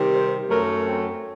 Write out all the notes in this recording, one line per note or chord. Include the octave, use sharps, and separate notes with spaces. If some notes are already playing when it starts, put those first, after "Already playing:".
Already playing: C3 D#3 G3
C5
F#2 F#3 A3 A#4
C4